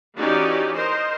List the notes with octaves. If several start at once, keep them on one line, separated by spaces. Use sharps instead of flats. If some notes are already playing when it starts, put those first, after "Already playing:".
E3 C#4 D#4 F#4 G4 D5
A#4 C5 D#5